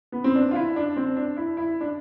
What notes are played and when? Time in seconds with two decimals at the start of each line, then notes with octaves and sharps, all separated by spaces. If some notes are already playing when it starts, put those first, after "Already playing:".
0.12 B3
0.24 C4
0.35 D4
0.51 F4
0.55 E4
0.76 D4
0.96 C4
1.16 D4
1.37 E4
1.57 E4
1.81 D4